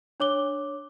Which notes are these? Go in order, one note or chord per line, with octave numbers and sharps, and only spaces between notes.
D4 C#5 D6 G7